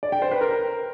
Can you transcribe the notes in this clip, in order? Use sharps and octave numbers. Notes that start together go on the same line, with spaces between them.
D5
G5
C5
B4
A#4